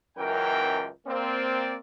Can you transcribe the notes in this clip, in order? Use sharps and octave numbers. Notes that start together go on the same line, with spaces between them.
C#2 F#2 E3 A#4 G5
A#3 C4 D5